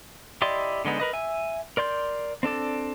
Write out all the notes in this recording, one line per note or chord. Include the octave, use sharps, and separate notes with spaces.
E4 G4 D5 D#5 C6
D3 G#3 B3 D#4
A#4 B4 D#5
E5 G#5
A#4 D5 C6 G6
C4 D4 A4 D5